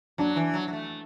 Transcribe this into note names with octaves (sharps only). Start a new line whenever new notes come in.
F#3 D4
E3
F#3
F#3
A3